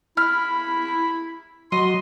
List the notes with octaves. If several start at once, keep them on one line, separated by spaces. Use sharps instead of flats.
E4 B5 F6
F#3 D#5 C6